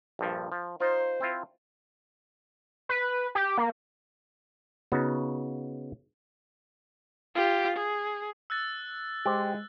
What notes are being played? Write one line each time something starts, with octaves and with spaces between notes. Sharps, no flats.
A#1 G2 F3
F3
D#4 F4 C5
C4 E4 F4
B4
G4
A#3
C#3 B3 D#4 F#4
F4 G4
G#4
E6 F#6 A6
G#3 G4 C5